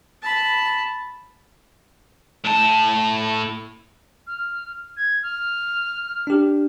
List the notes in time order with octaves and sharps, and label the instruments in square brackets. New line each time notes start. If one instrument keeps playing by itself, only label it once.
[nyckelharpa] A5 B5
[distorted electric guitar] A2 A5
[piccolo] F6
G#6
F6
[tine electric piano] D4 G4